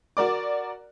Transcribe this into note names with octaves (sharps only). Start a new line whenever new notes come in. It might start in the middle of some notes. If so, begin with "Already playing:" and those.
F#4 A#4 D5 D6